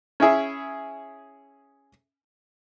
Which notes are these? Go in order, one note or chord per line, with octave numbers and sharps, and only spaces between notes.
C#4 E4 G#4 E5